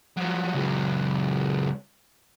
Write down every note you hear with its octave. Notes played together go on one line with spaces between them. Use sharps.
F3 F#3
C#2 F#3